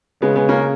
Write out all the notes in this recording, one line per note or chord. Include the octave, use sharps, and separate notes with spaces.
C#3 G#3 B3
G#3 B3
A#3 C#4